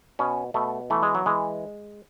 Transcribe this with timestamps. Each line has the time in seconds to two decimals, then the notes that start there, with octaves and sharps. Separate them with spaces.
0.19 B2 C#4
0.54 B2 A3
0.90 E3 A3
1.03 G#3
1.15 F#3
1.26 E3 G#3